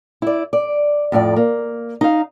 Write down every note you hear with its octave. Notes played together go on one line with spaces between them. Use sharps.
E4 D5
D5
F2 A2 F#4 D5
A#3
D#4 F5